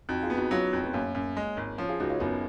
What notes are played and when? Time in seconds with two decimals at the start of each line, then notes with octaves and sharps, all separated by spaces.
0.09 F2 D#4 F#4
0.23 F4 G#4
0.30 B3
0.37 D#4 F#4
0.51 F#3 C#4 F4
0.73 F2
0.84 B3
0.93 F#2 A#3 C#4
1.15 F#2
1.37 G#3
1.57 G#1
1.78 F3 C#4 F4
1.89 F4 G#4
2.00 C#2 D#4 F#4
2.09 C#4 F4
2.20 F#1 B3 D#4